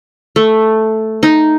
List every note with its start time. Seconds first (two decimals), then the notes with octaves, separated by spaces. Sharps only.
0.36 A3
1.23 D#4